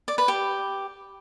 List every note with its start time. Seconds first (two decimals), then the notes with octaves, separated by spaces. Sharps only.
0.08 D5
0.18 B4
0.28 G4